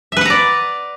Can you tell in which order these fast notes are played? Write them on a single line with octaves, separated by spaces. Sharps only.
E5 B4 F#5 A#5 D5